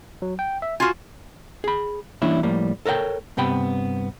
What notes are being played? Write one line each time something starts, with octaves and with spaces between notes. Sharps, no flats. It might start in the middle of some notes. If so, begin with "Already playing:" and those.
F#3
G5
E5
F4 F#4 G#5 C6 F6
G#4 B5
E3 G3 A#3 C#4 D4 E4
A2 F3 G3 A#3
A4 A#4 C#5 F5 G5
G2 C3 B3 G5 B5